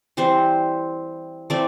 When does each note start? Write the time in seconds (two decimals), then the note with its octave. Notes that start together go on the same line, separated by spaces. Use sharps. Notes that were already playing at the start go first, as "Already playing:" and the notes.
0.17 E3 G3 C4 C5
1.50 E3 A3 C4 D5